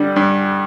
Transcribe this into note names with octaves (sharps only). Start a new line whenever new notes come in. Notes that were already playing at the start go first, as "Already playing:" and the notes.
Already playing: G2 D3 G3 D4
G2